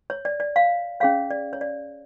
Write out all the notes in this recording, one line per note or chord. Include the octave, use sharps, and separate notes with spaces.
C#5
D5
D5
F5
C#4 G#4 C#5 F5
D5
C#5
D5